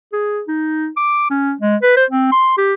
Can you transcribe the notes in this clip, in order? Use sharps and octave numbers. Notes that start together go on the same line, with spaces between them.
G#4
D#4
D6
C#4
G#3
B4
C5
C4
C6
G4